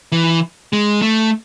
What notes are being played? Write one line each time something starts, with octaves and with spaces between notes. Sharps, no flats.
E3
G#3
A3